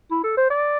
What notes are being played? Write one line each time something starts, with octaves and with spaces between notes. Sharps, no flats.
E4
A4
C5
D5